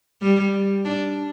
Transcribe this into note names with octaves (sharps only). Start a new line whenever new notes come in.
G3
D4